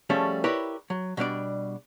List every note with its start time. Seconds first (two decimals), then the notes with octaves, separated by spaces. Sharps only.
0.10 F3 G3 A3 C#4 G#4
0.44 E4 G4 A#4 B4 C#5 D5
0.90 F#3
1.17 B2 G3 D4 D5